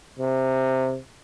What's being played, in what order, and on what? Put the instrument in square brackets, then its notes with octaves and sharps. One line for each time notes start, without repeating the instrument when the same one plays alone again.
[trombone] C3